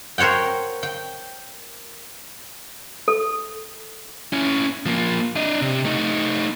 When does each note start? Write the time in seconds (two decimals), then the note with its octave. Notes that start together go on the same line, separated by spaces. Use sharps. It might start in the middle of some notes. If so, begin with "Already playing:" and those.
0.18 A#4 C5 C#5 F#5 G5
0.83 G5
3.08 A4
4.33 C#4 E4
4.86 F3 A#3
5.36 D4 D#5
5.62 C3
5.85 A3 D#4